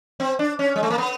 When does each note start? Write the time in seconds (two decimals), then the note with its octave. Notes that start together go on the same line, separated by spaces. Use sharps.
0.20 C4
0.39 D4
0.59 C#4
0.76 G#3
0.83 A3
0.90 A#3
0.98 B3